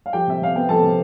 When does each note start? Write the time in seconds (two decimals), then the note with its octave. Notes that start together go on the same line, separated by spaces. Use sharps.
0.06 F5
0.13 F3 G4 G5
0.28 C3 E5
0.42 C3 F5
0.55 B3 G5
0.69 F3 A4 A5
0.83 C3